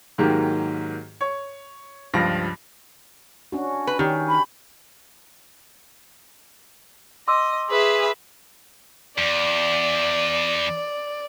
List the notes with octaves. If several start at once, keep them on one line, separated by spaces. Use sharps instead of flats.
G#2 D#3 F#3 A#3 G4
C#5
C#2 G2 F3 A#6 D7
C#4 D4 F#4
B4
D#3 C#4 G4
B5
D#5 C6 D6 E6
G#4 B4 E5
E2 D5